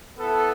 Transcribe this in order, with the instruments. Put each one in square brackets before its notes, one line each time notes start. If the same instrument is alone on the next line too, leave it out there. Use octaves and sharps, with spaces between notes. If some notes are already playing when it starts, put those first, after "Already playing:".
[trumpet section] B3 E4 A4